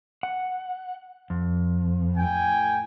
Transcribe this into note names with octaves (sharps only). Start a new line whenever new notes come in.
F#5
F2
A2 G5 G#5